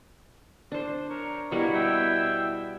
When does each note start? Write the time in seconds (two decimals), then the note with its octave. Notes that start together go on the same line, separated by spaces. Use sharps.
0.72 D4 C5
1.10 A#4 C#5
1.51 B2 G3 A#3 E4 C#5 F#5
1.75 E5 G5 E6